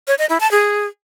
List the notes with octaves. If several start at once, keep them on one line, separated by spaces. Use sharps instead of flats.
C#5
D#5
E4
A5
G#4